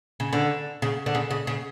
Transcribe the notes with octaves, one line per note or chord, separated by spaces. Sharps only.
C#3
D3
C#3
D3
C#3
C#3
C#3